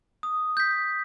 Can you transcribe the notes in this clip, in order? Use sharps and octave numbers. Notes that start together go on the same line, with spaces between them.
D#6
G6 B6